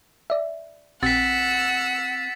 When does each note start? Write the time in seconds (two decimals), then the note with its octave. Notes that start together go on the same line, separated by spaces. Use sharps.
0.30 D5 E5
1.03 A#1 C4 F#5 E6 A6 B6